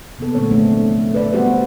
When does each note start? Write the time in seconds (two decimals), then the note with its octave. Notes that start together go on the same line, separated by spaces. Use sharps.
0.19 C3 A#3 B3 A4
0.35 A#2 D3 G#3 A3 C4 C#5
0.51 F3 F#3 A3 A#3 C4 D4
1.14 B4 D5 E5
1.33 G3 B3 F#4 G4 C5